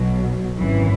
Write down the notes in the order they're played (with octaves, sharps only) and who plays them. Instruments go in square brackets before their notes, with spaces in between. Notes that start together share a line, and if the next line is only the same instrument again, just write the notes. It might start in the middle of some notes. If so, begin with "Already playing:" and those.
Already playing: [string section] B1 B2 F#3
G#1 F#2 E3